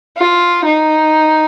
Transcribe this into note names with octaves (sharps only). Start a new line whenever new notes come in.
F4
D#4